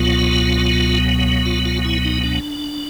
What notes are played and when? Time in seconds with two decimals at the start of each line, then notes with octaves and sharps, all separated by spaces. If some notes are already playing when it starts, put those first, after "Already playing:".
Already playing: C#2 B2 F#3 B3 F4
1.46 F4
1.65 F4
1.85 E4
2.05 D#4
2.24 D4